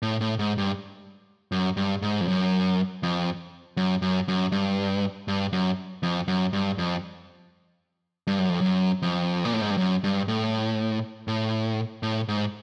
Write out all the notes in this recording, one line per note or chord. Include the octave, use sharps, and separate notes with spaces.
A2
A2
G#2
G2
F#2
G2
G#2
F2
F#2
F2
F#2
F#2
F#2
G2
G2
F#2
F2
F#2
G2
F2
G2
F#2
F2
F#2
F2
A#2
A2
G#2
G2
F#2
G2
A2
A2
A2
G#2